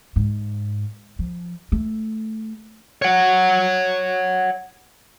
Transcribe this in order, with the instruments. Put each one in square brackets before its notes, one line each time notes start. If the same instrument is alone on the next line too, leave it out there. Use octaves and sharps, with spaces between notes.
[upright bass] G#2
F3
A3
[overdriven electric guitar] C#5 F#5